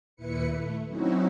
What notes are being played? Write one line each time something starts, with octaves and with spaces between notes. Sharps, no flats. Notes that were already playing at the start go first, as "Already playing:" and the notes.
D#2 A#2 E4 B4 C#7
A3
F#3 C4 C#4 D#4 E4 F#4